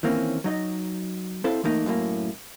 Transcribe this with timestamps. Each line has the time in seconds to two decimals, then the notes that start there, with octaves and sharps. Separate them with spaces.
0.03 D#3 E3 A#3 C4 C#4
0.44 F#3 D#4 D#5
1.44 C4 E4 A4 C5 F5
1.63 E3 A3 A#3 D#4
1.86 F#2 A2 A#3